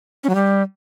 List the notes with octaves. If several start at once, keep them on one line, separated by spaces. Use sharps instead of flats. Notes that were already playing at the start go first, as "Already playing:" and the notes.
C#4
F#3
G3